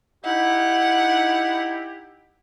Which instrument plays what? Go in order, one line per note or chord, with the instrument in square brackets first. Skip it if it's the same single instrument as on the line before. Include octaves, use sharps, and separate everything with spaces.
[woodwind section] D#4 E4 G4 [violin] F#5